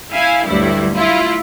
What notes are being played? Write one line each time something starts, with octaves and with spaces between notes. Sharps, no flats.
E4 E5 F5 G#5
D2 G2 F#3 E4
E4 F4